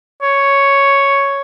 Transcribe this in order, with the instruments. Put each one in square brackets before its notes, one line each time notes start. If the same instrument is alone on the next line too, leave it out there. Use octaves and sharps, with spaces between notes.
[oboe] C#5